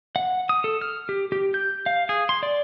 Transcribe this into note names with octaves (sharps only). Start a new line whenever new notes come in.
F#5
D#6
A4
F6
G4
G4
G6
F5
G#4
C6
D5